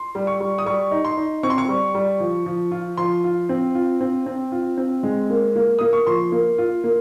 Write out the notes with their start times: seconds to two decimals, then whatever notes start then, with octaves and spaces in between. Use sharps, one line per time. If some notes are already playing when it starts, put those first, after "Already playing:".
Already playing: C6
0.15 G3
0.27 C#6
0.40 G3
0.58 D#6
0.66 G3 C#6
0.91 D#4
1.05 C6
1.17 D#4
1.43 C4 C#6
1.50 C6
1.58 C#6
1.68 G3
1.95 G3
2.20 F3
2.46 F3
2.71 F4
2.98 F3 C6
3.24 F4
3.49 C4
3.75 F4
4.01 C4
4.26 C4
4.52 F4
4.78 C4
5.03 G#3
5.30 A#3
5.56 A#3
5.79 A#3 D#6
5.93 C#6
6.07 F3 C6
6.32 A#3
6.58 F4
6.84 A#3